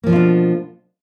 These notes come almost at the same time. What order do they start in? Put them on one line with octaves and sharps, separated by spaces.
A#3 F3 B2 F4 D4